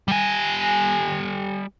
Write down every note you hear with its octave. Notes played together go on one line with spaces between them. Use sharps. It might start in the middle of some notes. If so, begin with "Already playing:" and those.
G3 G#5